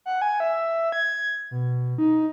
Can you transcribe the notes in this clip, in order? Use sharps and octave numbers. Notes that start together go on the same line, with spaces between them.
F#5
G#5
E5
G#6
B2
D#4